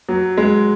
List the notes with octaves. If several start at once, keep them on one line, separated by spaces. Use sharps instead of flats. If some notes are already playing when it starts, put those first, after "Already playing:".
F#3
G#3